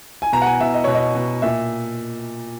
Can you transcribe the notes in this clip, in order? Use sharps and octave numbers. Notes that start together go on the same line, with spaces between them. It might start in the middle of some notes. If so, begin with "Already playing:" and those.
G#5
B2 A#5
F#5
G#5
B2 E5
D#5
B2 C#5
D#5
B2
A#2 E5